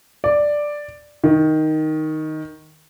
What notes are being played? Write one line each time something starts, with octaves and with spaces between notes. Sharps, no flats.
D5
D#3